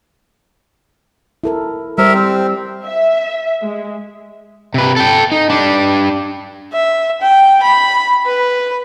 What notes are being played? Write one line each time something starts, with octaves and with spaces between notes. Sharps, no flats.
E4 A4 A#4
G3 G4 A#4 C5 E5
C4
E5
G#3
C3 B4
A4 G5
D#4
G3 D4
E5
G5
B5
B4